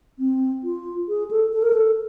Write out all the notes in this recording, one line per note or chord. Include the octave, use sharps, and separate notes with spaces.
C4
F4
G#4
A4
A4
A#4
A4